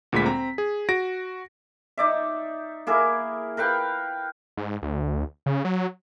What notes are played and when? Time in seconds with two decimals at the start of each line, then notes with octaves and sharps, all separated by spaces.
0.12 D2 A#2 G#3 B5 B6
0.26 C4 A#5
0.58 G#4
0.89 F#4 A#6 D7
1.97 D#4 D5 E5
2.87 A#3 E4 G#4 A#4
3.57 A#4 B4 F5 G5
4.57 G#2
4.82 D2
5.46 C#3
5.65 F#3